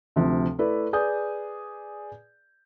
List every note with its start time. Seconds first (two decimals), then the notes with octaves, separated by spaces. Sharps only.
0.16 D2 C3 F3
0.59 A3 E4 B4 D5
0.93 G#4 B4 D5 G#5 D#6 G6